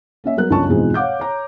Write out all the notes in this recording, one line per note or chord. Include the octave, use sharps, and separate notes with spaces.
A#3 C#4 E5
F#3 B3 A#4 F#6
G1 C#2 F#2 C#4 A5 C#6
E2 G#2 B2 F3 G#3 C4
C#5 F5 F#5 D6 G6
C#5 A#5